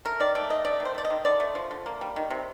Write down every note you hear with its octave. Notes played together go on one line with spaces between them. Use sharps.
A3 A#4
D#3 D5
A3 D5
D#3 D#5
A3 D5
D#3
C5
A3
D5
D#5
D#3
D3 D5
A3
F3
D3
A#3
G3
D#3
C3